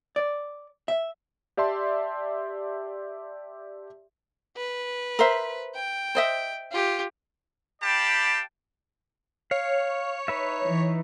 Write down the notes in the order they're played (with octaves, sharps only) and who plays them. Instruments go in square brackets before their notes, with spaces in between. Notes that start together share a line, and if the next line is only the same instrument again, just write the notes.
[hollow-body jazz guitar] D5
E5
[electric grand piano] G4 D5 E5 A5 C6
[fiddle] B4
[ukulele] A#4 C5 E5
[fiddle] G5
[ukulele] C5 D#5 E5
[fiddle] F4 G4
[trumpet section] G4 D5 F5 G5 A5 B5
[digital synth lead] C#5 [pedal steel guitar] F5
[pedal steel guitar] D#4 B4 E5
[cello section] E3